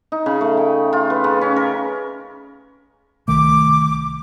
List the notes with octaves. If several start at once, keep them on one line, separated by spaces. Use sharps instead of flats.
D#4
C#3
A3
G5
F4
B4
C#3
C#4
A#4
C2 D#3 A3 D6